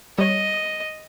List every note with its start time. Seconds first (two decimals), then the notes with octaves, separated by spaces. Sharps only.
0.18 G3 C#5 D#5